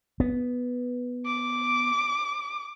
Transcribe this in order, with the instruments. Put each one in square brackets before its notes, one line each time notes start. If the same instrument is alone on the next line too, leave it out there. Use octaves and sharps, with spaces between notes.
[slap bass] B3
[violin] D6